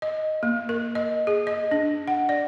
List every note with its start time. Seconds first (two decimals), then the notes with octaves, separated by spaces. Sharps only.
0.02 D#5
0.43 A#3
0.69 A#4
0.95 D#5
1.27 G#4
1.47 D#5
1.71 D4
2.08 F#5
2.29 D5